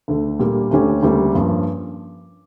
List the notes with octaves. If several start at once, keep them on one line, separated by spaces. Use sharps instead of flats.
D2 D3 A3
A#2 G3 A#3
D2 D3 A3 C#4 G4
D2 C#3 G3 A#3
G2 F3 A#3 C#4